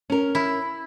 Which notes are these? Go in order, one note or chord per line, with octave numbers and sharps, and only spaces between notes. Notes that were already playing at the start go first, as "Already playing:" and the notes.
C#4 A#4
E4